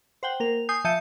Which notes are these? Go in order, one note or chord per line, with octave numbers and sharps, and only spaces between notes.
C5 F#5 G5
A#3 A#4 F7
G#5 D#6 G6 C7
F3 E5 A5 G6 C#7 D#7